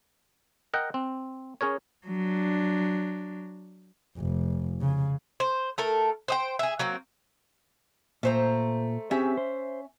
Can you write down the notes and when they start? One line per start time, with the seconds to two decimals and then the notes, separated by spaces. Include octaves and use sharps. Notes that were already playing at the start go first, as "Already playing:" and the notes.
0.74 A#4 D#5 F#5 G5
0.94 C4
1.61 C#4 G#4 A#4 C#5
2.07 F#3 D4
4.17 F1
4.81 C#3
5.40 C5
5.78 A3 A4 A#4
6.28 C5 D#5 G5
6.59 G#4 E5
6.79 F#3 A#3 C4
8.23 A#2 A3 C5 A#5
9.11 C4 C#4 G4 G#4 E5
9.37 C5